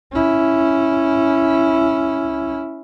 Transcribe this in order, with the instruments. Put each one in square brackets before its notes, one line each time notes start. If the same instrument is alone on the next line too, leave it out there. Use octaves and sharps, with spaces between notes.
[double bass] C#4 E4